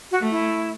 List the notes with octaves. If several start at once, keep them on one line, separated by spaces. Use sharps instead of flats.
F#4
A3
E4